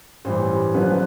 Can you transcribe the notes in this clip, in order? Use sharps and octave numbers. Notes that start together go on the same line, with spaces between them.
A1 G2 E3 G3 C5
F#1 F#2 D3 F3 B4
C5
B4